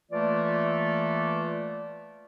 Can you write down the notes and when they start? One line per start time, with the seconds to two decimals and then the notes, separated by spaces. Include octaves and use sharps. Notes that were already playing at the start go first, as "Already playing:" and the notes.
0.12 E3 A3 A#3 F4 D5